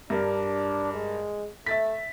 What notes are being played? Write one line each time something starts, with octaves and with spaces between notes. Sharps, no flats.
G2 D4 A#4
G#3
A3 E5 A6 B6